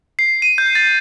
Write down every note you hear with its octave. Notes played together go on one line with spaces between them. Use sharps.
C7
D#7
G6
A6